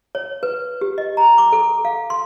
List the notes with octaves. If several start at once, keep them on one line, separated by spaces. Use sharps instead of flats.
C#5
B4
G4
D#5
A#5
D6
A4
F5
C6